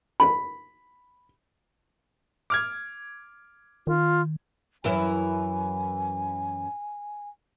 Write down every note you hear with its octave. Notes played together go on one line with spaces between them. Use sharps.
B5
D6 F6 G#6
D#3 F4
F#2 E3 E4 G#5